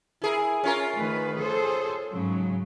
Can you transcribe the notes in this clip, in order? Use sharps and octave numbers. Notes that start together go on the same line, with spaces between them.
E4 G#4 A#4
C#4 F4 A#4
D#3 A3 B4
G#4 A4 C5
G#2 C#3 F#3